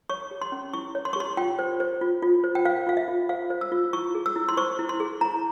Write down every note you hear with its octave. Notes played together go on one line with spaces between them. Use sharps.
C#5 C#6
G4
C6
C#4
E4 C#6
C#5
C6
C#6
G4 C6
F4 G5
C5
C5
F4
F4
C5
G5
C5 F5
F4 F5
E5
F4
C5 F5
C5
E6
F4
E4 C#6
G#4
E6
E4
C6
C5 C#6
E4
C6
G#4
E4 A#5